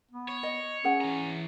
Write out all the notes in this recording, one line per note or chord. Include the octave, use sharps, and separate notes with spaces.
B3
C#5
D#5
C#4 G#4 F#5
E3 A#5